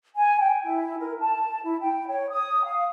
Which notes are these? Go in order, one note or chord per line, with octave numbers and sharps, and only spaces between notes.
G#5
G5
E4
A#4
A5
E4
G5
C#5
D#6
F5